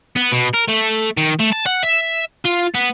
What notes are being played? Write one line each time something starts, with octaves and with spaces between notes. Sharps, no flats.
B3
B2
A#4
A3
D#3
A3
A5
F#5
E5
F4
B3